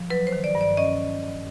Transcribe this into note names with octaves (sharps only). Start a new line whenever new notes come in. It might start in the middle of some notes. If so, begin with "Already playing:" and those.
Already playing: F3
F#3 B4
C5
D#3
D5
G2
D5
C#4 D#5